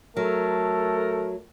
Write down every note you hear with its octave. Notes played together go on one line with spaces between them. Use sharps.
F#3 A3 A4 A#4